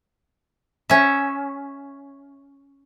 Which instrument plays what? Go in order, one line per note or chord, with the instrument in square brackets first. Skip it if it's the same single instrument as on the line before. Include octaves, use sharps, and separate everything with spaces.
[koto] C#4 E5